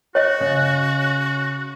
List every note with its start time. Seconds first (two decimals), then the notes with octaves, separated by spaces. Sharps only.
0.15 F#4 C#5 D#5
0.40 C#3